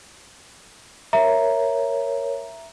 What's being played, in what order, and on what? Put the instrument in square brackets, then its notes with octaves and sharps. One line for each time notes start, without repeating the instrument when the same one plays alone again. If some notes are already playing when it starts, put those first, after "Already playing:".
[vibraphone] A#4 C#5 [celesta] E5 A#5